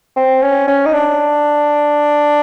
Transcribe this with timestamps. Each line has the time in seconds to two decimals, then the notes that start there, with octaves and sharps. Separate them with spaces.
0.16 C4
0.42 C#4
0.68 C#4
0.85 D#4
0.93 D4